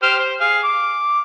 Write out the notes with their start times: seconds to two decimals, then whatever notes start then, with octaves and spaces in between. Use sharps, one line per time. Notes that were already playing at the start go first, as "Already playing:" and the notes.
0.02 G4 C5 F6
0.19 C5
0.40 G#4 F5
0.64 D6